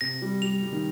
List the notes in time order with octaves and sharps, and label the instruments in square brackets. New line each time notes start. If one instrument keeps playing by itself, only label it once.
[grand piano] C3 [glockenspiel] A#6
[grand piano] G3
[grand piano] G3 [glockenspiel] F7
[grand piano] G3
D#3